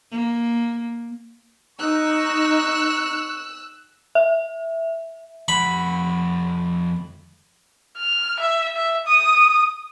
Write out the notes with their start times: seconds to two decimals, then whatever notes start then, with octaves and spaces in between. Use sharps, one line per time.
0.11 A#3
1.79 D#4 C#6 E6 F#6
4.15 E5
5.48 F2 F#5 B5
7.97 F6
8.39 E5
8.76 E5
9.07 D#6